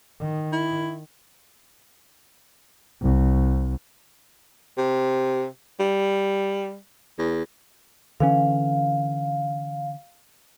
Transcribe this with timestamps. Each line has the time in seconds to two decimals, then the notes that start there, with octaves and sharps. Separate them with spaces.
0.19 D#3
0.53 E4
3.01 C2
4.78 C3
5.79 G3
7.19 E2
8.20 D3 E3 C#4 F5